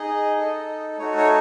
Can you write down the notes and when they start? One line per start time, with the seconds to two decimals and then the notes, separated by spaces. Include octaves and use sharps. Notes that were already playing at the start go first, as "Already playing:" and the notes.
Already playing: D#4 G#4 D#5
0.38 D#4 A4
0.98 A3 D#4 F#4 C#5
1.18 C#5